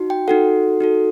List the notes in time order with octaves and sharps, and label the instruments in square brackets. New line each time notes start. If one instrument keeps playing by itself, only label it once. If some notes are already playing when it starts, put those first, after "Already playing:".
Already playing: [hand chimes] D#4 F#4
G5
D#4 F#4 A4 F#5
D#4 F#4 A4